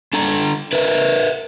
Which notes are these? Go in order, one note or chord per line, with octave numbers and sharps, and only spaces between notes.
D4 A4 A#5
A#4 B4 E5